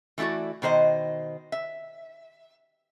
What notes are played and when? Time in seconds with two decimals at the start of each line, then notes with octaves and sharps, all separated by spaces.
0.18 E3 A3 E4 F#4 D5
0.62 B2 D#3 C5 D#5
1.52 E5